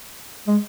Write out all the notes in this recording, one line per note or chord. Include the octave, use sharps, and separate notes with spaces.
G#3